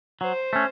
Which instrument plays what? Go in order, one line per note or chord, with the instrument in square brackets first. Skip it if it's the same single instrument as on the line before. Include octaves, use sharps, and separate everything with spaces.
[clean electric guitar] F#3 [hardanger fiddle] C5
[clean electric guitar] A3 C#4